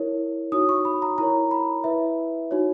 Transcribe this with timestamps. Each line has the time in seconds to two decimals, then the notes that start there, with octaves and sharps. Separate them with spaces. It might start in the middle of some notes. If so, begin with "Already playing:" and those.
Already playing: E4 A#4 C#5
0.52 D#4 F#4 C#5 D#6
0.69 C#6
0.85 B5
1.02 A#5
1.18 E4 A#4 C#5 A#5
1.51 B5
1.84 E4 B4 E5
2.51 D#4 F#4 C#5